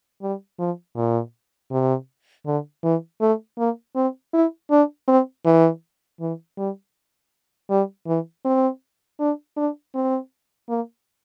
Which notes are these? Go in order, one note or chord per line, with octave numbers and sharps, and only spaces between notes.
G3
F3
A#2
C3
D3
E3
A3
A#3
C4
E4
D4
C4
E3
E3
G3
G3
E3
C4
D4
D4
C4
A#3